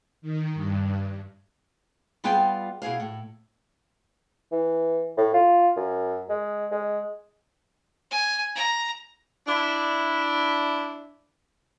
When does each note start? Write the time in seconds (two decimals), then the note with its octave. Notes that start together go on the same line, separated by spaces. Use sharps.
0.22 D#3
0.54 G2
2.24 G3 B3 F4 G#4 F5 G5
2.82 B2 E4 G#4 F5
3.00 A2
4.52 E3
5.18 A2
5.34 F4
5.76 F#2
6.29 G#3
6.71 G#3
8.11 G#5
8.56 A#5
9.47 D4 E4